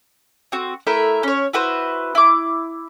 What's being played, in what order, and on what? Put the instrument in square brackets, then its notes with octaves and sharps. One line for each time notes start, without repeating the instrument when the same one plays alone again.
[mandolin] C4 F#4
A3 E4 A#4 E5
C#4 C#5
E4 F#4 B4 C5
E4 D6